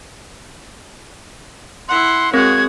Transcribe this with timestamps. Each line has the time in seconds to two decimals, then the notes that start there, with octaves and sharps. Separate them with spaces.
1.88 E4 F#5 C6
2.33 G#3 C4 F#4 A#4 C#5 G#6